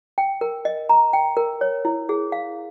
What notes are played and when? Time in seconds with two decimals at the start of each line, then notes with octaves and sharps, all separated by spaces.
0.18 G5
0.41 A#4
0.65 D#5
0.89 A#5
1.13 G5
1.37 A#4
1.61 C#5
1.85 E4
2.09 G#4
2.32 F5